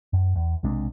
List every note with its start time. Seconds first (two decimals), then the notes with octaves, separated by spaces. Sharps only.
0.13 F#2
0.36 E2
0.63 B1 C3 G#3 D4